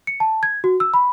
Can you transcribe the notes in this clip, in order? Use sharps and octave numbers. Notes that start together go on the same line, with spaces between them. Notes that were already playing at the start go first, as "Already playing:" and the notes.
C#7
A5
G#6
F#4
E6
B5